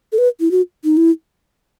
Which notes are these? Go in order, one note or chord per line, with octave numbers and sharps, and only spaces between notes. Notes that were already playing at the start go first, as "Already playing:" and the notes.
A4
B4
E4
F#4
D#4
E4